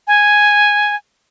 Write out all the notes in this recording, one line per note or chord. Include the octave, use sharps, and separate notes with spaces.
G#5